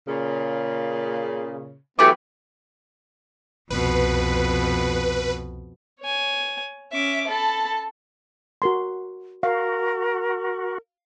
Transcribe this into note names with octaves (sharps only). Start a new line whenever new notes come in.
A#2 C#3
E3 F#3 A3 B3 G4 D6
C2 F2 B2 B4
C#5 G#5
C#4 E5 D6
A4 A5 B5
F#4 A#4 C6
F#4 A#4 F5